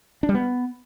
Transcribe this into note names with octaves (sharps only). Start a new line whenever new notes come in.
D4
G3
B3